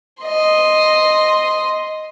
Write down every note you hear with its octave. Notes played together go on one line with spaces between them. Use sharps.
D#5 C6